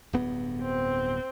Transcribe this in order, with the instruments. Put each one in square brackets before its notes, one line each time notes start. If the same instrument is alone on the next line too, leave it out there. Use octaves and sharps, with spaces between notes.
[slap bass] D1 G2 B3
[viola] C4